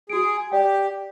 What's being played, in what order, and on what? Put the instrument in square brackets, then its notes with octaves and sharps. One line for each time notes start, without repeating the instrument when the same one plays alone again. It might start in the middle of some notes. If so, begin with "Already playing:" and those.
[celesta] F#4 D7 [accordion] G#4
[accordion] G4 [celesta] D5 G5